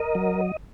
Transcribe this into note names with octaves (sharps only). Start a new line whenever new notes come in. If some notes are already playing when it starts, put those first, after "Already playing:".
Already playing: A#4 D#5
F#3